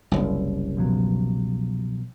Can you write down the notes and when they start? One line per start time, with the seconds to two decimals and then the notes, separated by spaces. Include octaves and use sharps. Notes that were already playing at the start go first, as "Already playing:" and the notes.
0.12 F#1 C2
0.77 B2 F3 F#3